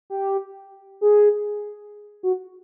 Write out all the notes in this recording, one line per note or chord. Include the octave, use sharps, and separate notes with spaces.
G4
G#4
F#4